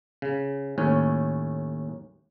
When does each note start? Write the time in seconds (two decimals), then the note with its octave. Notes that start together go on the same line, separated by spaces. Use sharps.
0.22 C#3
0.78 D#2 A2 C#4